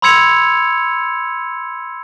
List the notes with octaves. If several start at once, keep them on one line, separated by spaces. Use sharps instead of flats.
B5 C6 E6 G#6 C#7 F7